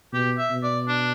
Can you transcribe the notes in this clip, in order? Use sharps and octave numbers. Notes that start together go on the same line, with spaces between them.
B2 G4
E5
B2
D5
D4